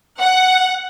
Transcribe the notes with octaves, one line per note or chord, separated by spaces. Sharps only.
F#5